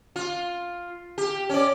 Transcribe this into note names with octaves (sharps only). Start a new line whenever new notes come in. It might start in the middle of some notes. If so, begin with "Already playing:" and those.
F4
G4
C#4 D5